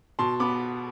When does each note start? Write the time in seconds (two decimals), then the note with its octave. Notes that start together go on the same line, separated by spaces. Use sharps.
0.19 B2 A5 C6
0.40 B3 B5 D6